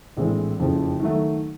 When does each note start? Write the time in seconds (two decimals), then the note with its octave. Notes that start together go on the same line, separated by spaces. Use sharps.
0.17 A#1 A2 E3 G#3 C4
0.59 F#1 F2 C#3 F3
1.00 D#3 F#3 A3